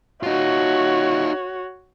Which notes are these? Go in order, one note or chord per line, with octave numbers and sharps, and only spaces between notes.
D#4 F4 F#4 C#5